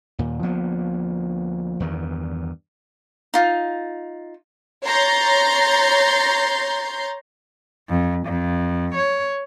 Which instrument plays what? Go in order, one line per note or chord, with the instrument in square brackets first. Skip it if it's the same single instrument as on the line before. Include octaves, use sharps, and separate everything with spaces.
[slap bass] D#2 A#2
D2 F3 A#3 B3
E2 G2 D#3
[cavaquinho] D#4 F4
[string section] C#5 A#5 C6 G6 A6 C7
[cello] F2
F2
C#5